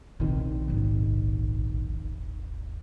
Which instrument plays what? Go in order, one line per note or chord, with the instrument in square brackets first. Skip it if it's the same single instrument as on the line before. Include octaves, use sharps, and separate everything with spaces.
[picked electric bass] A#1 D#3 [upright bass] C3
[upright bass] D#1 G#1